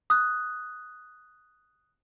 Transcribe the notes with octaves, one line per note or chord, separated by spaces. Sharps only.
D#6 F#6